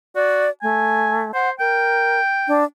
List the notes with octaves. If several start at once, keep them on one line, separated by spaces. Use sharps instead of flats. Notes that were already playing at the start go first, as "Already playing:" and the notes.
F#4 D5
A3 G#5
C5 F#5
A#4 G5
D4